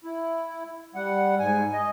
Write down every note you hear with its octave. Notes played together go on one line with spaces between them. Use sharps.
E4
G3 F#5
G#2 G#5
D#5